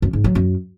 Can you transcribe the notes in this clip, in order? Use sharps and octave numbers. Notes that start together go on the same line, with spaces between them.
F#2
G#2
F#3
F#2